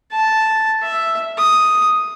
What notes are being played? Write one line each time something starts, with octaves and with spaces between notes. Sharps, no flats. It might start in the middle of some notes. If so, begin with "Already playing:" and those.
A5
E5
D#6